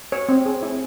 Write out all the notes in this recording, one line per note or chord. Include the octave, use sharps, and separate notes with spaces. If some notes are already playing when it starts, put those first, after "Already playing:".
C#5
C4
G#4
E4